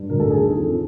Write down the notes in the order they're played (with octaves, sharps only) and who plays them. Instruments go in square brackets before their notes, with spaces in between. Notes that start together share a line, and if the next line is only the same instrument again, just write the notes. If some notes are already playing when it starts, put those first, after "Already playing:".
Already playing: [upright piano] G2
D2 A#4
A4
D#3 G#4
A4
F2